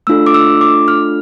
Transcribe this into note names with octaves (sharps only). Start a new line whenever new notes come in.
A3 D4 F4 A4 E6
D6
E6
D6
F6